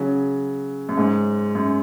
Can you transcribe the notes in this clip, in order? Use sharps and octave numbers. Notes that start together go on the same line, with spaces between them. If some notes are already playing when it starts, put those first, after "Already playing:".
Already playing: C#3 F#3
F#2
G#2
F#2